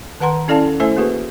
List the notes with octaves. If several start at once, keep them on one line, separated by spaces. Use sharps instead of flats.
D#3 B4 F#5 A#5 C6
C#4 E4 A4 D5 F5 A5
A3 E4 A4 C5 E5 G#5
A#3 F#4 G#4 B4